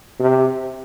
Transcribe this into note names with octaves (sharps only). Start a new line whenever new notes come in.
C3